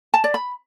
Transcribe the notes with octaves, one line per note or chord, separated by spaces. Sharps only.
A5
D5
B5